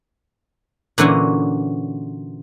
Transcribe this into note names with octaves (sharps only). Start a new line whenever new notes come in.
A#2 D3 E3 C#4 F#4